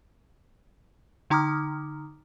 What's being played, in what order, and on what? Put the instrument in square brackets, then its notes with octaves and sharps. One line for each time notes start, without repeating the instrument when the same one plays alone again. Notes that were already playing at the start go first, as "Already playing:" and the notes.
[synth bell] D3 D#4 A#5 D6 D#6 F6